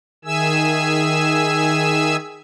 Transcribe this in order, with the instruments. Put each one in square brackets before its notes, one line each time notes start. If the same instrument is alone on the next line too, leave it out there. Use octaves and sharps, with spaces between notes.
[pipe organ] D#3 G#4 E5 G#5 E6